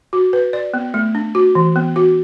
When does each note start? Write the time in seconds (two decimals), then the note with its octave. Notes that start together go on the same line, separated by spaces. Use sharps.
0.13 F#4
0.33 B4
0.53 D5
0.74 B3
0.94 A3
1.15 D4
1.35 F#4
1.55 E3
1.76 B3
1.96 F#4